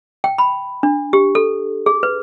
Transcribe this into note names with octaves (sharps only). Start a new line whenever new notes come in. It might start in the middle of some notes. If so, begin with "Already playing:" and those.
G5
B5
D4
G4
A4
G#4
B4